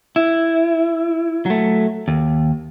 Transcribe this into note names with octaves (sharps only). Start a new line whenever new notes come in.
E4
F#3 A3
D#2